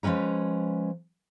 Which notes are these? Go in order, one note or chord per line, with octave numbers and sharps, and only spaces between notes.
F3 G#3 C#4 B4 A#5